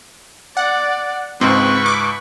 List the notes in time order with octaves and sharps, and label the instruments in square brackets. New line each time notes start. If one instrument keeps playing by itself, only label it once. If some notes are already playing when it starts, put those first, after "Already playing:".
[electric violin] D5 [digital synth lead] F#5
[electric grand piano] C#2 G#2 [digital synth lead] C4 [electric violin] B4 C#6
[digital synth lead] D6